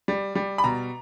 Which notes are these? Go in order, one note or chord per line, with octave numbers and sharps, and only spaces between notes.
G3
G3
B5
B2 A#5